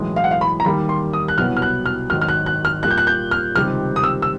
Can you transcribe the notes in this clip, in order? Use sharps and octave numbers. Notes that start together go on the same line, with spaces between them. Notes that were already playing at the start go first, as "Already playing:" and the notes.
Already playing: B1 A2 E3 G#3
F5
F#5
F5
B5
A#5
D#2 D#3 G3 A#3 B5
C6
D#6
F#6
C2 B2 F#3 B3 E4 F6
F6
F#6
F6
G#1 G#2 D#3 F#3 F6
F6
F#6
F#6
F6
A#2 G3 A#3 F#6
G6
F#6
G6
F6
C#2 C3 D#3 G3 C4 F6
D#6
E6
E6